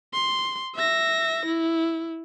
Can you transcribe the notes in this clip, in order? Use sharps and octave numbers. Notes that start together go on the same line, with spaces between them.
C6
E5 A#6
E4